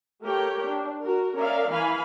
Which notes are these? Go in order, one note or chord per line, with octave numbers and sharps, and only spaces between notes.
A3 G4 A#4 C#5 G5
D4
F#4 A#4
C#4 A#4 D5 E5 F5
E3 F5 G#5 B5